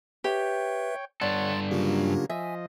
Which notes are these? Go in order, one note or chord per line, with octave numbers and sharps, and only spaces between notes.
G4 B4 C#5 E5 G5
G2 A4 C#5 D5 F#5 C6 A6
C#3 F#3 A#3 D4 F4 G4
F3 D#5 E5 G#5